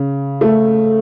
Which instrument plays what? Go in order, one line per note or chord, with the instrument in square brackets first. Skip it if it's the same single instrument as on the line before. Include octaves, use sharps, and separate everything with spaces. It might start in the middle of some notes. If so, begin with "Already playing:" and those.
Already playing: [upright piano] C#3
A3